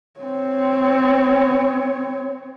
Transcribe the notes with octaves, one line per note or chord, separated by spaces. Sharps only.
C4 C#5